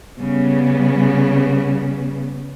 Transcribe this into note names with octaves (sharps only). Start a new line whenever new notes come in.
C#3 G3 B3